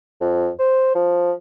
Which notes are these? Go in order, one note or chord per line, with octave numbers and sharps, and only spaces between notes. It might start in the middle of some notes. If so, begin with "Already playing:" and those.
F2
C5
F3